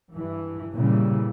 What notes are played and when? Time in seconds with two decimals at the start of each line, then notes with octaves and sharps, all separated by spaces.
0.14 G2 E3
0.73 A#2 C#3 E3 G3